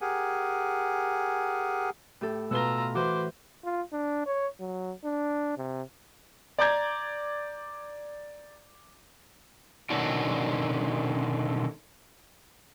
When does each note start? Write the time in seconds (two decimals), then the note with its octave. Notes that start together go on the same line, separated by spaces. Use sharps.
0.01 G4 G#4 A#4 F#5 G#5
2.21 A2 G4 A4
2.51 B2 F4 B4 A#5 E6 G7
2.95 E3 F#4 B4 C5 D6
3.64 F4
3.93 D4
4.26 C#5
4.60 F#3
5.05 D4
5.57 C3
6.58 D5 A#5 D6 G6 G#6
9.90 B2 D3 D#3 C#4 D4 F#4